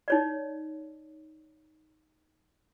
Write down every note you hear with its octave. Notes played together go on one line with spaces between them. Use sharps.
D#4 C#5 D5